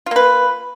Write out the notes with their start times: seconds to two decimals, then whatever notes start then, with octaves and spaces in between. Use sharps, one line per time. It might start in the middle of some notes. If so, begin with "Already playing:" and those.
0.06 F4
0.11 A#3
0.16 B4